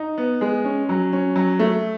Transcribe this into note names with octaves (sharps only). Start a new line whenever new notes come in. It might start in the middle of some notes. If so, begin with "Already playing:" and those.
Already playing: D#4
B3
G#3
C#4
F#3
C#4
F#3
A3